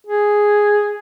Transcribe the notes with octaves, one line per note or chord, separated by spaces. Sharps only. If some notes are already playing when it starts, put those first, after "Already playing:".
G#4